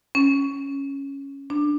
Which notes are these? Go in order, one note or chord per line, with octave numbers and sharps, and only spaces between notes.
C#4
D4